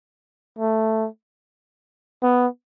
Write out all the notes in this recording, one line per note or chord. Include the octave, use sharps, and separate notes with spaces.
A3
B3